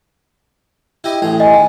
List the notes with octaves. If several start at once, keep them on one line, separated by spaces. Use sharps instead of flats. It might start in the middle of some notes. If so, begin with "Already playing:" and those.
E4 G4 D#5
A1 A2 G#4
D#5 G#5
D#3